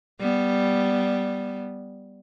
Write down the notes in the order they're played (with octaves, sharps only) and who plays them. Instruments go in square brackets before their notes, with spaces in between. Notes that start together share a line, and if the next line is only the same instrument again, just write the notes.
[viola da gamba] G3 B3